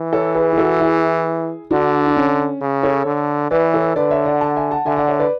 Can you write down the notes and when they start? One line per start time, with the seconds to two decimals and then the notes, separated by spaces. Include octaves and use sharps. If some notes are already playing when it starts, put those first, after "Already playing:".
Already playing: E3
0.13 A4 C#5
0.35 G#4 B4
0.53 G#4
0.58 F#4 A4
0.80 E4 G#4
1.71 D3 D4 F#4
2.06 D4
2.16 C#4
2.61 C#3
2.83 A4 C#5
3.06 D3
3.51 E3 B4 D5
3.73 A4 C#5
3.96 D3 B4 D5
4.11 C#5 E5
4.25 D5 F#5
4.41 F#5 A5
4.56 E5 G#5
4.71 F#5 A5
4.86 D3 E5 G#5
4.97 D5 F#5
5.08 C#5 E5
5.19 B4 D5